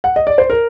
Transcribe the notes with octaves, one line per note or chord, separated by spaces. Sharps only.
F#5
D#5
D5
C5
A#4